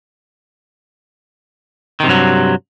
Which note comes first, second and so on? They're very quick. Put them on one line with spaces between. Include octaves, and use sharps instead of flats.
D#3 C3 G2 F#3